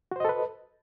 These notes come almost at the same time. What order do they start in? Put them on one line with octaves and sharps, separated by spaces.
F#4 C5 D#5 A4 B4